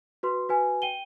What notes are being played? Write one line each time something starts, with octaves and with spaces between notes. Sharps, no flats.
F#4 B4 C6
F#4 B4 G#5
G5 D#7 G7